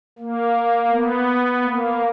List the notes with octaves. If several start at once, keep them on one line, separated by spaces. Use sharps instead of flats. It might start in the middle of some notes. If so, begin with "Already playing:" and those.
A#3
B3
A#3